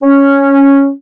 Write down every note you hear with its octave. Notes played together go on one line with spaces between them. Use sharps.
C#4